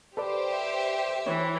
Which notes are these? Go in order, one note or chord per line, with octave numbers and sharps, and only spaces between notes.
G4 A4 B4 C5 D5
E5
E3 B4 C#5